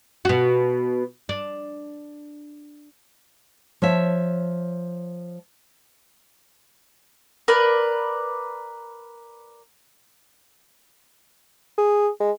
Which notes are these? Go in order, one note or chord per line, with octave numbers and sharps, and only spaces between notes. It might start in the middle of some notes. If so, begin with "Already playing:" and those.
B2 F#4
D4
F3 C#5 E5
A#4 B4 D5
G#4
G#3